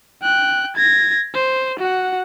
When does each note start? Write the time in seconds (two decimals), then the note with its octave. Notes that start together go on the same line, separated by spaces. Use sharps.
0.22 G5 F#6
0.76 G#6 A#6
1.35 C5
1.80 F#4 F#5